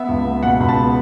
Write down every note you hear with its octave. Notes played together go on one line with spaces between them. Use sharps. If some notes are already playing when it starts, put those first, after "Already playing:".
Already playing: B3 E5
C#2
B3
B2 F#5
C#2 B5
A5
B3